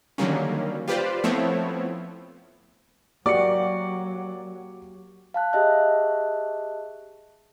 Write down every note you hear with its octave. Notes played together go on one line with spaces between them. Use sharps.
D3 D#3 F#3 G3 A#3 C#4
F4 G4 B4 C5 D5
F3 A3 B3 C4 E4 C#5
F#3 A#3 F#4 G4 D5 D6 C#7
F5 A5 F#6
G4 G#4 D#5 E5 A5 F#6